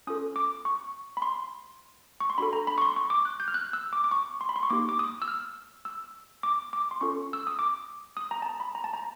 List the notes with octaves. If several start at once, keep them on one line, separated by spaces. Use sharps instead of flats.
C#4 F4 A4 D#6
D6
C#6
B5
C6
C#6
C6
D4 F#4 A4 B5
A#5
B5
C#6
C6
C#6
D6
F#6
G6
F6
F#6
E6
D6
D6
C#6
C6
B5
C6
C#6
A#3 D#4 G4 D6
D6
D#6
E6
F6
E6
D6
D6
C6
C#4 F4 A4 C#6
E6
D#6
D6
D#6
A#5
A5
A#5
B5
A#5
A5
A#5